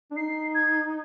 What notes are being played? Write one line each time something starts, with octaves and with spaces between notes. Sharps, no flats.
D4
D#4 C7
G#6